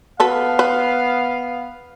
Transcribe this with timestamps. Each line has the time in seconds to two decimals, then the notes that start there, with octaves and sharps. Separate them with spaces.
0.20 B3 F#4 A4 B4 F5
0.59 B4